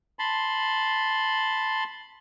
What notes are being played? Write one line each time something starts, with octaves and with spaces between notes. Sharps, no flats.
A5 B5 C6